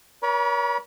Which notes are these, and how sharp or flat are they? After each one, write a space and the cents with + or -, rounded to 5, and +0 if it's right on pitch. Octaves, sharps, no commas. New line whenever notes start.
A#4 +40 C#5 +40 B5 -30